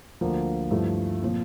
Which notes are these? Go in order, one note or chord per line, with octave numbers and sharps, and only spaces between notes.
D2 D3 F3 A#3
G2 F3 A3 E4 A4
A#2 F3 C4